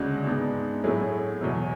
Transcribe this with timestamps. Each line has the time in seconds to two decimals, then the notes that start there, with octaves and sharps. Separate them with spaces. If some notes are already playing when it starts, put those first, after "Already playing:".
Already playing: D2 C#3 G#3 D4 F#4
0.26 G#2 G#3 B3 D4
0.84 A2 F#3 A3 E4 G#4
1.41 E2 B2 F#3